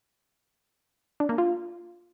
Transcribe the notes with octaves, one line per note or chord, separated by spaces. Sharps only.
D4
A#3
F4